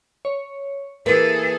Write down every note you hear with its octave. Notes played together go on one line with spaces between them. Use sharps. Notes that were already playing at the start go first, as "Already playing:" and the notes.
C#5
E3 A#3 G#4 A4 B4